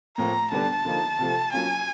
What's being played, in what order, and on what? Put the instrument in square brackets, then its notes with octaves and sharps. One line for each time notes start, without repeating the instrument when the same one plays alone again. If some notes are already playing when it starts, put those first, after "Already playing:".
[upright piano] A2 F3 A#3 [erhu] A#5
[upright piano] D3 G3 B3 D4 [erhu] A5
[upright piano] D3 F3 A#3 D#4
C3 F3 A3
[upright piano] F#3 A#3 C#4 F4 [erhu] G#5